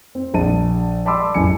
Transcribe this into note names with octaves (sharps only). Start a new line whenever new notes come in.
C4
A#1 A5 D#7
D5 A5 B5 C6 D6 E6
A1 F#2 E3 G#5 C#7